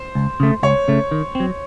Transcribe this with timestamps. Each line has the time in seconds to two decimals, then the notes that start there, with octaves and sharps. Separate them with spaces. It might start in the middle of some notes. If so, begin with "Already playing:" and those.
Already playing: C5
0.15 C#2
0.40 C#3 A3
0.63 C#2 C#5
0.88 C#3 A3
1.11 D#3
1.35 F#3 C4